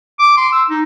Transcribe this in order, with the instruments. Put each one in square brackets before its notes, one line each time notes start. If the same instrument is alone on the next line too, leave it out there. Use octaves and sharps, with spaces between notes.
[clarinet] D6
C6
E6
D#4